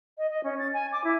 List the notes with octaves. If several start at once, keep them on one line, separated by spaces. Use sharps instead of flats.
D#5
D#5
C#4
A6
G#5
D6
E4